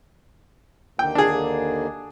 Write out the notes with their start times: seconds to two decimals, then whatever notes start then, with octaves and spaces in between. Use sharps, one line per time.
0.99 D#2 D3 A#3 G5
1.15 D4 G#4